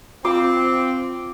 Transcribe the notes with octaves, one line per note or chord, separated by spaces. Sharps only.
C4 F4 D6